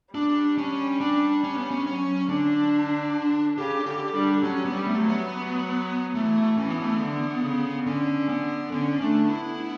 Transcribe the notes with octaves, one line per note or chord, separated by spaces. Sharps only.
G3 D4
C#4
D4
C#4
B3
C#4
F#3 C#4
D3 D4
C#3 G4
D3 G4
G3 D4
F#3 C#4
B3
G3
A3
F#3
B3
E3 A3
E3 C#4
B3
A3
B3
D3
C#3
D3 C#4
B3
D3 C#4
A3 D4
B3 E4